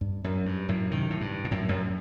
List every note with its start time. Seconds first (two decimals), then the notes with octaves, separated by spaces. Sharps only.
0.01 G2
0.24 F#2
0.46 G2
0.69 F#2 A2
0.91 C3 D#3
1.10 A2
1.21 G2
1.45 A#2
1.51 F#2 A2
1.69 F#2